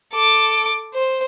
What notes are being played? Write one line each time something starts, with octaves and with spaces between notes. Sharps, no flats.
A4 D6
C5